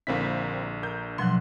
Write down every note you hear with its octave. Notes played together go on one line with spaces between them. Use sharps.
A#1 D3 A#3 C4 E4 B6
A#4 G6
B2 F3 F#3 C6 F#6